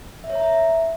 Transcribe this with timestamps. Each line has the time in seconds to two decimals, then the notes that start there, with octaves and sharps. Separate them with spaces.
0.24 E5
0.30 C#5
0.35 A#5
0.41 E5